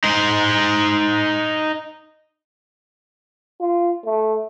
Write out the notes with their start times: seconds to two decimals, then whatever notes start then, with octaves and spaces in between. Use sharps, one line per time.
0.04 D#4 C5
3.60 F4
4.05 A3